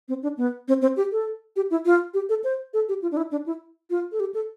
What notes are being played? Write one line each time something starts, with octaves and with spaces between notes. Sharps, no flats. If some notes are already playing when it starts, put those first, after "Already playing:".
C4
D4
B3
C4
C4
G4
A4
G4
E4
F4
G4
A4
C5
A4
G4
F4
D4
E4
D4
E4
F4
A4
G4
A4